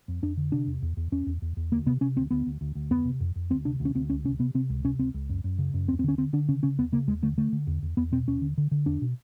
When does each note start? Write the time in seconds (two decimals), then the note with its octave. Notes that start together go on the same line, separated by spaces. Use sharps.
0.08 F2
0.22 F2 D4
0.37 D3
0.52 C3 D4
0.67 E2
0.82 E2
0.97 E2
1.12 E2 C#4
1.27 E2
1.42 E2
1.57 E2
1.72 D2 A#3
1.86 C3 B3
2.01 C3 C#4
2.16 D2 C4
2.31 D2 B3
2.47 D2
2.61 D2
2.75 D2
2.90 F2 B3
3.05 C3
3.20 F2
3.36 F2
3.50 D2 C4
3.65 C3 D4
3.80 D2
3.85 C#4
3.95 D2 C4
4.10 C#2 C#4
4.24 C3 C#4
4.39 C3 B3
4.55 C3 C4
4.70 C#2
4.85 C3 C#4
4.99 C#2 C4
5.14 C#2
5.29 F#2
5.44 F#2
5.58 C#3
5.74 F#2
5.88 D#2 C4
5.99 C4
6.04 D3 C#4
6.18 D3 C4
6.33 D3 D4
6.49 C#3 C#4
6.63 C#3 C#4
6.78 D#2 B3
6.92 C#3 A#3
7.07 D#2 G#3
7.22 D3 A3
7.37 D3 A3
7.52 D3
7.67 E2
7.82 E2
7.97 E2 B3
8.12 B2 C4
8.28 D#2 C#4
8.42 D3
8.58 D3
8.71 D3
8.86 E2 D4
9.02 B2